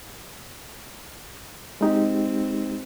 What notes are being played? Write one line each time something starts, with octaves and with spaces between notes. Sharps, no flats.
G#3 C4 D#4 G4